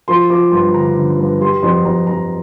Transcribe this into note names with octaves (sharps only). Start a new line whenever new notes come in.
F3 C6
F3 D6
G2 C6
D3 A#5
D3
G2
G3 C6
F2 C6
F2 A#5
F2 A#5